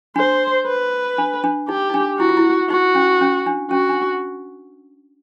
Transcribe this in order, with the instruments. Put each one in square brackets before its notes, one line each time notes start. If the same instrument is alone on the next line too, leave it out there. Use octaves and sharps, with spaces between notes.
[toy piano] D4 [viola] C5
[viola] B4
[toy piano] D4
D4
[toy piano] D#4 [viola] G4
[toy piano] D#4
D4
[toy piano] E4 [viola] F#4
[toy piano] F4
E4
[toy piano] D#4 [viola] F#4
[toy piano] C#4
C#4
D4
[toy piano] C#4 [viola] F#4
[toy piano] D4